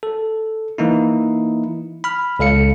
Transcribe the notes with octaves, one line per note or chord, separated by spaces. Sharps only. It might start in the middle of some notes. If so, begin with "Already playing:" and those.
A4
E3 A#3 D#4 E4
B5 F6
C#2 A4 F5 C#7